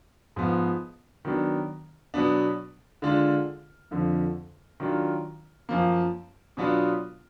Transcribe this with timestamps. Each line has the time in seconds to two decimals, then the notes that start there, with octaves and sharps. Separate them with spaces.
0.36 G#2 F3 B3
1.25 D#3 F#3 B3 D4
2.14 B2 F#3 B3 D4
3.02 D3 G#3 D4 F4
3.91 F2 D3 F3
4.80 D#3 F#3 D4 F4
5.69 F#2 F3 A#3
6.57 B2 F#3 B3 D4 F4